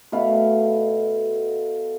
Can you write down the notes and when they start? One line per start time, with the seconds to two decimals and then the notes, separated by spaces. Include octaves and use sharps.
0.12 B2 A3 F5 B5